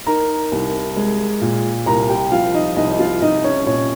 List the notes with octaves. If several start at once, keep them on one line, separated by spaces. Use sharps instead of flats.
D#4 A#4 A#5
C2
G#3
A#2
C2 A#4 A#5
G4 G5
F3 F4 F5
D#4 D#5
C2 D#4 D#5
D#5
F4 F5
C2 D#4 D#5
C#4 C#5
A#2 C#4 C#5